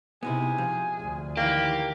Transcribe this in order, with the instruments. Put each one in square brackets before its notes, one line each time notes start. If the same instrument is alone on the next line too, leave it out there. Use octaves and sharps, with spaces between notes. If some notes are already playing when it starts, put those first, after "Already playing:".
[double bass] C3 [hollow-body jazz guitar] B3 D#4 E4 [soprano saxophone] G#4
[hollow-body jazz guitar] F3
[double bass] D2
[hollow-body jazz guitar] D#3 E3 [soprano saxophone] A#3 [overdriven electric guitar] G4